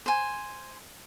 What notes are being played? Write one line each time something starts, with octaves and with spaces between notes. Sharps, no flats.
C5 G#5